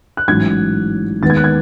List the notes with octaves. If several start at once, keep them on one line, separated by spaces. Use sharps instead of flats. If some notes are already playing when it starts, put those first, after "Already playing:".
F#6
A1 G#2 F#3 G#6
D#2 D#3 G#3 B3 A6
G#6
F#6
G#6